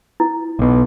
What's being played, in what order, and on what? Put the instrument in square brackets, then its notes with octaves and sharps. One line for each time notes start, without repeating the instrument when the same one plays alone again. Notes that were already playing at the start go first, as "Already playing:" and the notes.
[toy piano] E4
[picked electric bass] B1 B2